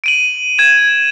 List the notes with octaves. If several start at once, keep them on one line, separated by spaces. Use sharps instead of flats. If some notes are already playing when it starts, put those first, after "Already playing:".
D7 D#7 F#7
G#6 E7